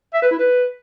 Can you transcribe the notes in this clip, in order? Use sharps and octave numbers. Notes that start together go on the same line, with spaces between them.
E5
B4
E4
B4